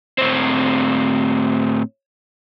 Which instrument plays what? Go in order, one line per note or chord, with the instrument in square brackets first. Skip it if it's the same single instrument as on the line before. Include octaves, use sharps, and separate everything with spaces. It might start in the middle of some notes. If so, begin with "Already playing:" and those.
[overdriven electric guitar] A2 C4